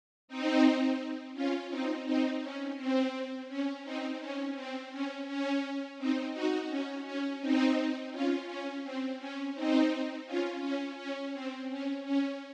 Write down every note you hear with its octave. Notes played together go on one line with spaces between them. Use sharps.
C4 D#4
C#4 F4
C4 D#4
C4 D#4
C#4
C4
C#4
C4 D#4
C#4
C4
C#4
C#4
C4 D#4
D#4 F#4
C#4
C#4
C4 D#4
C#4 F4
C#4
C4
C#4
C4 D#4
C#4 F4
C#4
C#4
C4
C#4
C#4